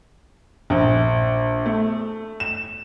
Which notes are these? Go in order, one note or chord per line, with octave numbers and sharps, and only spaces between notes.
A#1
A3
E7